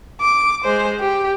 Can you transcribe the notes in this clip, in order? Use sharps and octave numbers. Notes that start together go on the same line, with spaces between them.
D6
G#3 C5
G4